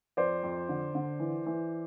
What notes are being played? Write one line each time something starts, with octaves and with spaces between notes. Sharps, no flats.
F2 C5 D5
F2
D3
D3
E3
E3